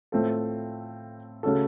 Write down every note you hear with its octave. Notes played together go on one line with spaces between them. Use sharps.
A2 A3 C4 F4 A4
C#3 A3 C#4 F#4 A4